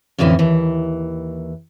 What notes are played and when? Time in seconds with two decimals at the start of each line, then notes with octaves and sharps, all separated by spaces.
0.19 F2 A2 D3 E3 C#4
0.39 D#2 E3